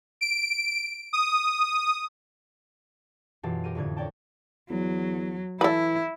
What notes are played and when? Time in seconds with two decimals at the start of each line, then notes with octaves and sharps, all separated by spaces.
0.21 D7
1.13 D#6
3.43 F#2 B2 E3 F4 G4 A5
3.64 G4 A#4 D#7
3.75 F2 A2 D3 G#6
3.96 A#4 C#5 D5 G5 A5
4.70 E2 F#3
5.61 E3 E4 A4 B4